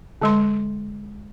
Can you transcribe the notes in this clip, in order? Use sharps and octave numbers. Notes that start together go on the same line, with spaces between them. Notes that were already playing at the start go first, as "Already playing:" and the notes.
D3 G#3 C6